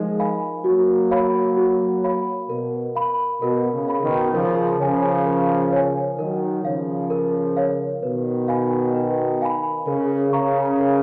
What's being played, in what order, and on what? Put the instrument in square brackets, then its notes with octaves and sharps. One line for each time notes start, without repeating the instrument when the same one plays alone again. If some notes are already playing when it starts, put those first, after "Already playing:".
Already playing: [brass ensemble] F3 G#3 [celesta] D#4 A#4
[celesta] A#4 F5 G#5 B5
[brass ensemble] F#3 A#3 [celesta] F#4
[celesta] C#5 F5 B5
F#4
C#5 F5 B5
[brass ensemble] B2 [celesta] A#4
[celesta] F5 B5
[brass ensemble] B2 [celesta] A#4
[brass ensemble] C#3
[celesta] F5 B5
[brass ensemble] B2 D#3
[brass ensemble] C#3 F3 [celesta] A#4
[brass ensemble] C#3 F3 [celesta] C#5 G#5
[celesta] A#4
C#5 G#5
[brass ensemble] D#3 F#3 [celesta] A#4
[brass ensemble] C#3 F3 [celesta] C#5 F5
[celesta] A#4
C#5 F5
[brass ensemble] B2 D#3 [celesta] B4
[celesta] F5 G#5 B5
B4
F5 G#5 B5
[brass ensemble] C#3 [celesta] A#4
[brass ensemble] C#3 [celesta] F5 A#5 C#6
[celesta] A#4